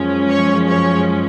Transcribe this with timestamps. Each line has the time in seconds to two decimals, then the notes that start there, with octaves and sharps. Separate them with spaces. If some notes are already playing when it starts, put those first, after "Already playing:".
Already playing: F#2 F3 G#3 C#4
0.30 C#5
0.67 C#5